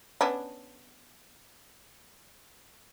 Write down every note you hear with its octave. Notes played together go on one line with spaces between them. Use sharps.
B3 C#4 D4